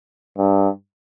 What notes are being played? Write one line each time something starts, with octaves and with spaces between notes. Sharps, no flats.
G2